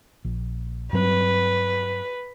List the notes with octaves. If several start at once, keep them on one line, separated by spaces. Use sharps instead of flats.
A#1
G2 F#3 C4 B4